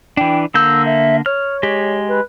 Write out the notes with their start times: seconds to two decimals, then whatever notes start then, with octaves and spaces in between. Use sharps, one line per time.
0.17 E3 D4 G5
0.54 D3 A#3 E6 G6
0.86 E5
1.26 C#5 F6
1.63 G#3 G4
2.08 B4